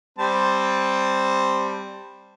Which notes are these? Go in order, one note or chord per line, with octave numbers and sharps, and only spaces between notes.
G3 C4 A5